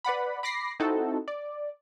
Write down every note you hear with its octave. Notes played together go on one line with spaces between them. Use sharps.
B4 D5 F#5 B5
B5 D6 A#6 C7
C4 D#4 E4 F#4 A4
D5